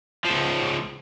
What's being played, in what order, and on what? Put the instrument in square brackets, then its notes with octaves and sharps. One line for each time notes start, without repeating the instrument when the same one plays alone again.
[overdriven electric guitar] C#2 F3